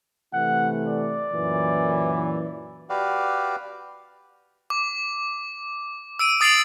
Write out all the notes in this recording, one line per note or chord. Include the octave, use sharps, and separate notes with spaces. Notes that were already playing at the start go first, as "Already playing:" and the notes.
C3 E3 A3 F#5
D5
F#2 A#2 E3
F#4 G4 B4 D5 F5
D6
E6 D7 D#7
D#6 A6 C7 D7 F#7